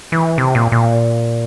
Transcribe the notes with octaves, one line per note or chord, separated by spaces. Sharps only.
E3
C3
A#2
A#2